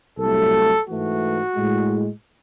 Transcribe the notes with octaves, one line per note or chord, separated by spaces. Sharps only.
C2 C3 F#3 A3 A4
G#2 E3 A3 F#4
A2 G#3